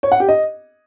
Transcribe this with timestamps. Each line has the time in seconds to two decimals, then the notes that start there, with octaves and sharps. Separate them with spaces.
0.03 C#5
0.12 F#5
0.20 G4
0.28 D#5